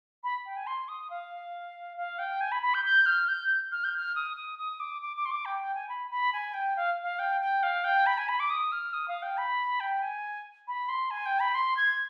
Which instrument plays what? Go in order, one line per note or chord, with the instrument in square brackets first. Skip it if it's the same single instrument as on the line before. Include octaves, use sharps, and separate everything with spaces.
[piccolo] B5
G5
G#5
C6
D#6
F5
F5
G5
G#5
B5
B5
G6
G6
F6
G6
F6
G6
F6
D#6
D#6
D#6
D6
D6
D6
C6
D6
G5
G5
G#5
B5
B5
G#5
G5
F5
F5
G5
G5
F5
G5
B5
G#5
B5
D6
D#6
F6
D#6
F5
G5
B5
G5
G#5
B5
C6
G#5
G5
B5
C6
G#6